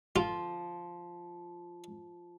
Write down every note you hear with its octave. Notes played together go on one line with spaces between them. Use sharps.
F3 F4